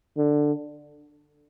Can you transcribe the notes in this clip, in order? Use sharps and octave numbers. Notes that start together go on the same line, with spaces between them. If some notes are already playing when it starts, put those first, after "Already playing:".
D3